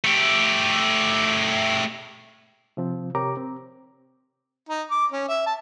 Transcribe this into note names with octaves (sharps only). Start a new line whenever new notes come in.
A3 G4
C3 F3 C4
C3 G4 A#4 C#5 A#5 D6
C4
D#4
D6
C#4
E5
A5